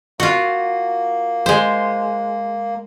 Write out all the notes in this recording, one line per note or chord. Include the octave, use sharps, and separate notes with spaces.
A#3 F4 F#4
G#3 C5